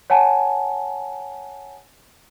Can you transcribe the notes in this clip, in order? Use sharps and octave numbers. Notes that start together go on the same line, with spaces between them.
C#5 F#5 G#5 A5